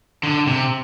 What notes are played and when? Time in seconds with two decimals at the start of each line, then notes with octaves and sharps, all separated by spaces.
0.23 D3
0.47 C3